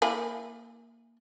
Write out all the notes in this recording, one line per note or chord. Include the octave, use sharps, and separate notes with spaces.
A#3 E4 G#5